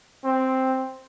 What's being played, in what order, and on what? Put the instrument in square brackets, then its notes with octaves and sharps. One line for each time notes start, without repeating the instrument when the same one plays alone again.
[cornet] C4